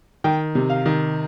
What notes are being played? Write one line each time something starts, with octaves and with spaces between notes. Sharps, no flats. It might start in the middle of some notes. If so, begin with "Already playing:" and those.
D#3 G5
C3
F5
D#3